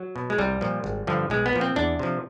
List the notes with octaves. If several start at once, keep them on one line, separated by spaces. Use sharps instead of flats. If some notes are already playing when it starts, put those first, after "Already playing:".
Already playing: F#3
B2
G#3
C2 G3
A#2 F3
G#1
G2 D3 F3
B1 G#3
B3
A#2 F3
C4
E2 D4
C3 F3